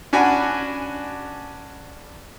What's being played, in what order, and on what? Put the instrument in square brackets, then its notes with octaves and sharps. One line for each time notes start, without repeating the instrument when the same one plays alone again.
[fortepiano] C#4 D4 F#4 G#5 B5